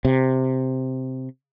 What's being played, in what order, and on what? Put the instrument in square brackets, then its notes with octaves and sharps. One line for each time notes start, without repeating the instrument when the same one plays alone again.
[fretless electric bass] C3